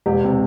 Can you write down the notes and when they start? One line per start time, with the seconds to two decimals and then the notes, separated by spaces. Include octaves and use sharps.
0.06 E1 G4
0.24 C3